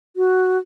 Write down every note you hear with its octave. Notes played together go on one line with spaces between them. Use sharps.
F#4